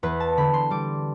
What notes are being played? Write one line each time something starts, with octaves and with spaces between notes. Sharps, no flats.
E2 B4
A5
D3 B5
C6
G3 D6